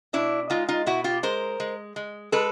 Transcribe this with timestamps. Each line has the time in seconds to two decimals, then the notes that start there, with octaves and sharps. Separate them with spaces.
0.13 B2 D4 E4
0.50 G#3 D#4 F4
0.69 D#4 F4
0.86 B2 E4 F#4
1.04 F4 G4
1.23 G#3 A#4 C5
1.60 G#3
1.96 G#3
2.32 G#3 A4 B4